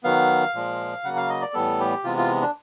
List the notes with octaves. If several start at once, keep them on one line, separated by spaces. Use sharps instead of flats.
D#3 F#3 B3 F5
A#2 F3 G#3
C#3 F#3 A#3 F#5
F5
D#5
D5
A2 E3 G3 B3 A4
G4
C3 E3 G#3 B3 F4
F4
D4